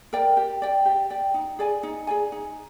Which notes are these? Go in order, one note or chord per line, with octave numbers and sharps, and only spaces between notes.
A#4 D5 G5
G4
D5 G5
G4
D5 G5
D#4
G#4 D5 G#5
D#4
G#4 D5 G#5
D#4